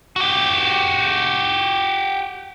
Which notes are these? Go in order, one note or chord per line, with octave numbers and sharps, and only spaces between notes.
F#4 G4